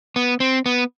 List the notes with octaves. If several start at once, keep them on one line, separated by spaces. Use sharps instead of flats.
B3
C4
B3